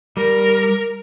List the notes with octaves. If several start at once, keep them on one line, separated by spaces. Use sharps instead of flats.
G3 A#4